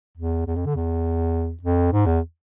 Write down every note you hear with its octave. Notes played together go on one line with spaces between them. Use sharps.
E2
E2
F2
D3
E2
F2
G#2
E2